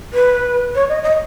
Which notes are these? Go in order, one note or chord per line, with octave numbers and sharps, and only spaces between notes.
B4
C#5
D#5
D#5